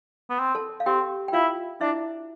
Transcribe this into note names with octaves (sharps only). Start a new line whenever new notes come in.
B3
C4
A4 A5
F5
C4 G4 G5
G5
E4 F4 F5
D4 E4 E5